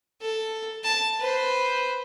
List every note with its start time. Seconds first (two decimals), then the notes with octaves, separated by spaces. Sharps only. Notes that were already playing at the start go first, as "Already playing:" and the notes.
0.21 A4
0.83 A5
1.19 B4 C5